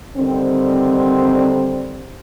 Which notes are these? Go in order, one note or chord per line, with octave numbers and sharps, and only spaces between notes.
D3 D#3 G3 C4